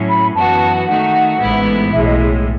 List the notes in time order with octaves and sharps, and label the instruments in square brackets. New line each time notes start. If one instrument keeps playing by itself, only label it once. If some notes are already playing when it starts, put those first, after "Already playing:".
Already playing: [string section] A2 F#3 C#4
[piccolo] B5
[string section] F#2 E3 B3 F#4 [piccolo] A5
[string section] D#3 A3 D#4 F#4 [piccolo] F#5
[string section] A1 G#2 E3 B3 E4
[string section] B1 A2 G#3 [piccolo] E5
[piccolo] D#5